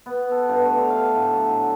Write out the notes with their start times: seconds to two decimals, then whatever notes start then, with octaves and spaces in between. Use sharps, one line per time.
0.06 B3
0.31 A4
0.49 G2
0.65 A3
0.78 D3
0.90 F5
1.16 A2
1.32 F#3
1.49 A2